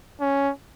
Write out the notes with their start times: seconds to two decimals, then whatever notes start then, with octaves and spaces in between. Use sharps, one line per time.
0.21 C#4